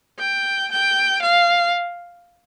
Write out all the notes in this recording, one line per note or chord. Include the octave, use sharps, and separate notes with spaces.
G5
G5
F5